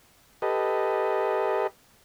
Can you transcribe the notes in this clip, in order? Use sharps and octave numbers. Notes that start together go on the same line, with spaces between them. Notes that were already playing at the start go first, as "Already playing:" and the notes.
G4 A4 B4 D#5